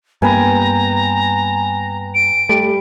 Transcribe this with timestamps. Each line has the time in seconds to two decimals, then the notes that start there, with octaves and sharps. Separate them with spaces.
0.22 G2 A#3 B3 B4 G5 G#5 A#5
2.15 D7
2.49 G3 A3